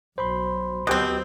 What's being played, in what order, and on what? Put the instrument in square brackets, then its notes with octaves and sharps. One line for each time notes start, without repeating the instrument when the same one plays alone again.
[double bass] B1 F#3 [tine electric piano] C5 B5 C6
[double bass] D2 F#3 [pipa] B2 C4 [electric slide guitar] B3 G4 D#5